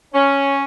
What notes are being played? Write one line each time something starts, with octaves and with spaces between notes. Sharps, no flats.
C#4